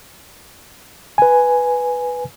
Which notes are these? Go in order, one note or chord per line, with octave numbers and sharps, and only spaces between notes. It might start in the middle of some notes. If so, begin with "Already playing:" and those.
B4 G#5